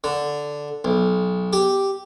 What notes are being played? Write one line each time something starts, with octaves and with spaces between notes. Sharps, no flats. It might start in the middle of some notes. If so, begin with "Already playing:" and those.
D3
B1
G4